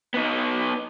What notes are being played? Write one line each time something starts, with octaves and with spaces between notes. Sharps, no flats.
B3 D#4